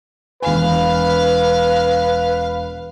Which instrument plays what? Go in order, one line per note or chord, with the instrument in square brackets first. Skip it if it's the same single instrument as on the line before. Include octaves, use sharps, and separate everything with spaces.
[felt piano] E1 G#5 [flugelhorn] B4 [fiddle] F5